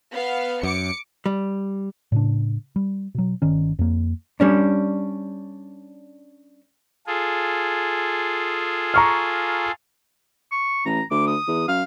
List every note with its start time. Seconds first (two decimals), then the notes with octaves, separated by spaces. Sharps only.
0.12 B3 F5
0.63 F#2 D6 C#7
1.26 G3
2.12 A2 C#3 D4
2.76 G3
3.15 B2 F#3
3.42 G1 D#3 C#4
3.79 F2 A#3
4.40 G3 C#4 D4
7.07 F4 G#4 A4
8.94 A#5 C#6 F6
10.52 C#6
10.86 A1 A#5
11.11 D2 D6
11.27 D#6
11.48 E2
11.68 F#2 F5